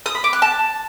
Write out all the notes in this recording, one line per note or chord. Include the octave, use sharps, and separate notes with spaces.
D#6
B5
D6
F#6
A5